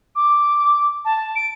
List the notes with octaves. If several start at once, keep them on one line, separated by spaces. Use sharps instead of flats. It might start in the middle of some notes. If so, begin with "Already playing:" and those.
D6
A5
D7